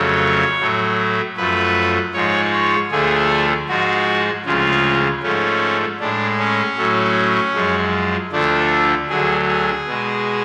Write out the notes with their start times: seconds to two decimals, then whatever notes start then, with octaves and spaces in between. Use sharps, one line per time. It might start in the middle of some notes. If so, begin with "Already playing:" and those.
Already playing: F2 C#3 F#3 A3 C#5
0.59 A2 F#3 A3
1.37 F#2 F3 A3 B4
2.14 G#2 F3 G#3 C#5
2.53 C#5
2.91 D2 D3 F3 A3 G#4
3.68 G#2 F3 G#3 F#4
4.45 D2 C#3 F3 G#3 F4
5.23 G#2 F3 A3 C#4
6.00 A2 G#3 D4
6.39 C#4
6.78 A2 F#3 A3
7.55 F#2 F3 G#3
8.32 D2 D3 F3 A3 D4
9.09 D2 D3 F#3 G#4
9.48 G#4
9.86 B2 G#3